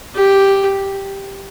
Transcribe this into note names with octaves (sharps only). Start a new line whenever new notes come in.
G4